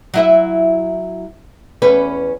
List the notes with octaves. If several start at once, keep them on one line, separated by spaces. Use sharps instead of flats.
F#3 E4 E5
E2 C#4 B4